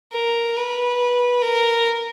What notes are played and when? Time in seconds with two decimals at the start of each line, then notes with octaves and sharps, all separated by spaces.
0.13 A#4
0.56 B4
1.42 A#4